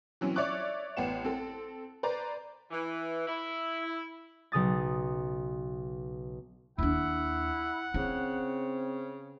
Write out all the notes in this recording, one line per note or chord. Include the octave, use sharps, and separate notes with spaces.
E3 F#3 C4 C#4
C#5 D5 E5 C#6 D6 F#6
A1 B3 F#5 E7
C4 A4
B4 C5 D5 A#5
E3
E4
B1 C#3 D#6 A6
D#2 D4 E4 F#5
C#3 C4 E4